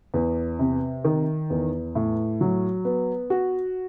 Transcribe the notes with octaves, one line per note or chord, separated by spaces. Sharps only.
E2
C3
D#3
E2
A2
F#3
B3
F#4